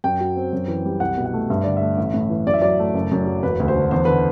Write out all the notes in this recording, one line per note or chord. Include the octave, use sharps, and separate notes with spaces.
F#2 G5
F#3
C4
F#2
E3
G3
C2 F#5
B2
F#5
A3
G2 E5
D3 D5
A3 E5
A1
A2
E3
F#2 D5
E5
F#3 D5
A3
F#1
F#2
F#3
E1 B4
D2
C5
D3
E2 C5
D3 B4